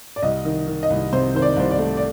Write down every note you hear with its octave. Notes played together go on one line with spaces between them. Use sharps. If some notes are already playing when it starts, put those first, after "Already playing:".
D5
C2 D#5
D#3
D#3
D#5
C2
C3 C5
D#3 C5
D5
C2 C5
D5
A3
D5